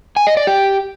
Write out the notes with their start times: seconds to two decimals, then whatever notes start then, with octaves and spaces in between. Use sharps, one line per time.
0.16 G#5
0.27 D#5
0.37 D5
0.47 G4